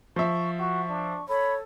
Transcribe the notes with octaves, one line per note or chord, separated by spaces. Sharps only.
F3 E5 C#6
F#4 C#6
D4
A4 C#5 B5